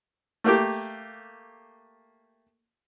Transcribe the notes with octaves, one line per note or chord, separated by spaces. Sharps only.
A3 A#3 G4